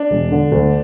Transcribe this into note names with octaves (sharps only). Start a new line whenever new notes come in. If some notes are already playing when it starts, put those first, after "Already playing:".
Already playing: D4
E1
D3
D2